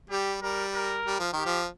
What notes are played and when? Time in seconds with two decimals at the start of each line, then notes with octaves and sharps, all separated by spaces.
0.10 G3 G4
0.42 G3 A#4
0.74 A#4
1.06 G3
1.19 F3
1.33 D#3 G4
1.45 F3